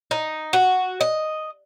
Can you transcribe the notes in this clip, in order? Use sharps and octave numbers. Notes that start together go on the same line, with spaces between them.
D#4
F#4
D#5